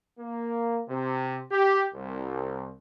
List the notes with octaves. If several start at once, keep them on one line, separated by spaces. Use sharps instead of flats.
A#3
C3
G4
C2